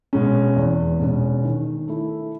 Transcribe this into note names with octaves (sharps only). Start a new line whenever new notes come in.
B2 G#3 C#4
E2
B2 G#3 C#4
D#3
A3 E4